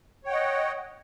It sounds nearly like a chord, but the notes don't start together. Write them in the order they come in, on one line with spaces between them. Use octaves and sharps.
C#5 G5 F#5 D#5